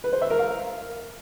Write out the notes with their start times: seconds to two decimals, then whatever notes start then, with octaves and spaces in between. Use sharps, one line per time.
0.04 B4
0.13 C5
0.21 E5
0.30 A#4
0.39 F5